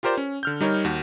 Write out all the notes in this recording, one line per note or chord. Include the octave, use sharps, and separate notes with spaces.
F4 G4 A#4 C5 D5
C#4
D3 F6 G6
G3 D#4 A#4 C#5
D#2 F#4